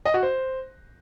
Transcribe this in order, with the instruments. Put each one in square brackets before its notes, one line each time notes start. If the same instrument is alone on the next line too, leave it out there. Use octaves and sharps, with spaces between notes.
[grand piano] D#5
F#4
C5